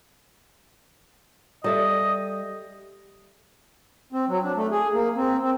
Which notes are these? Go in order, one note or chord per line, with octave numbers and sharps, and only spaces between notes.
G3 A4 D#5 E5
C4
F#3
D4
A3
G#4
A#3
C4
C4